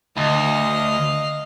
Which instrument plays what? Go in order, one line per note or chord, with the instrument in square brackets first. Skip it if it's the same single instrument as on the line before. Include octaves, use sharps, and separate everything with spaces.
[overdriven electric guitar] D2 [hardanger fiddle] D#5 F5